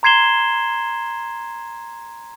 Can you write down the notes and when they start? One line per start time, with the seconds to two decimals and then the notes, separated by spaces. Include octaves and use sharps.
0.03 A#5 C6 G#6 C7 E7 G7